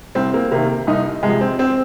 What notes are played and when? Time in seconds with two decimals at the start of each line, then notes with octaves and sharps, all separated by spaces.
0.15 C2 C4
0.34 A#3
0.51 C3 D#3 A#3
0.87 C2 D#4
1.23 C3 F3 G#3
1.41 C4
1.59 C4